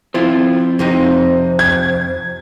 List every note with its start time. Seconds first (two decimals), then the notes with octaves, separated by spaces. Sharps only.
0.14 F3 C4 E4 F4 C5
0.79 F2 C3 D#4 C5
1.59 G#6